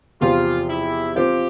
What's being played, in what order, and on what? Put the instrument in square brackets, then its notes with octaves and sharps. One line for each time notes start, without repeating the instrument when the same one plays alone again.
[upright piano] E2 C3 F3 C4 G4 [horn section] F4
[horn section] E4
[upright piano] F3 C4 F4 [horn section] G4